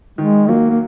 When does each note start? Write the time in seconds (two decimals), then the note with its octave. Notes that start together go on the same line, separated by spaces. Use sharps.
0.18 D#3 G#3
0.49 F#3 A#3
0.70 A#3